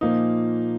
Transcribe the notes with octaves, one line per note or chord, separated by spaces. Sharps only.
A#2 F3 A#3 D#4